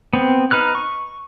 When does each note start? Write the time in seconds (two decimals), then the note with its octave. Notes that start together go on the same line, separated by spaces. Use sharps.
0.13 B3 C4
0.51 D#4 B4 F6 F#6
0.75 C#6